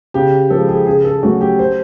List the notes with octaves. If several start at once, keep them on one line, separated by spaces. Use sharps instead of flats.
C#3 G4
F3 G#3 A4
G#4
C#3 G#4
A4
F#3 A3 C#4 F#4
G4
C5